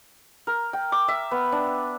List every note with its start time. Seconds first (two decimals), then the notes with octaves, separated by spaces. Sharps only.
0.47 A#4
0.73 G5
0.92 D6
1.08 E5
1.31 B3
1.52 D4